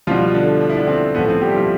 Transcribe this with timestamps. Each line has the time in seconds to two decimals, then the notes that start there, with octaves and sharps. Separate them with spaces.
0.07 F3 G3 F4
0.11 B2
0.34 D3 D4
0.61 D4
0.69 E4
0.76 D3 D4
0.88 C4
1.15 A2 F3 A3 B3
1.28 C4
1.42 G3 G4
1.50 E4
1.55 F3 F4